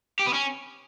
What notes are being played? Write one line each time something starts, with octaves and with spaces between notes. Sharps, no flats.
G4
B3
C#4